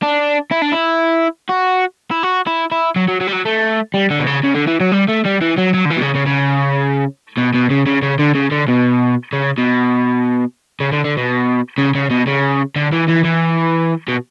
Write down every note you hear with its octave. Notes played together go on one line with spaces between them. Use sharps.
D4
E4
D4
E4
F#4
E4
F#4
E4
E4
F#3
F#3
F#3
G3
F#3
A3
G3
D3
B2
C#3
C#3
D3
E3
F#3
G3
A3
G3
E3
F#3
F#3
D3
E3
B2
C#3
C#3
C#3
B2
B2
C#3
C#3
C#3
D3
C#3
D3
B2
C#3
B2
C#3
D3
D3
B2
C#3
C#3
B2
C#3
D3
E3
E3
E3
B2